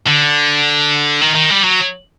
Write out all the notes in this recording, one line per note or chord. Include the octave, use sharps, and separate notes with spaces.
D3
D#3
D#3
G3
F#3